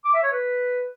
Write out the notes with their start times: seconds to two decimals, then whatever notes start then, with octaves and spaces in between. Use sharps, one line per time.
0.05 D6
0.14 E5
0.23 C#5
0.31 B4